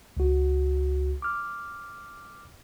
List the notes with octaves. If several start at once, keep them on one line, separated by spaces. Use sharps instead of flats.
C#2 F#4
D6 F6